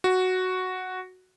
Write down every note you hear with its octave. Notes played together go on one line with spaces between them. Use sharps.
F#4